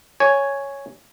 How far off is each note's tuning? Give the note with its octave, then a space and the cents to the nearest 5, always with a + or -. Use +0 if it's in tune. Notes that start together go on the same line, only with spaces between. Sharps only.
C#5 +0 G#5 +0